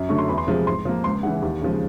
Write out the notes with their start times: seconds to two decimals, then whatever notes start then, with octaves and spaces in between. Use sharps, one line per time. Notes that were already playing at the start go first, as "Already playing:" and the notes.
Already playing: F#2
0.09 D3 F#3 A3 C#6
0.18 C6
0.28 E2 B5
0.38 C6
0.47 C3 F3 G#3
0.66 G#2 C6
0.85 F3 A#3
1.04 C#2 C6
1.23 C#3 E3 F#5
1.42 D#2
1.62 C#3 F3 G#3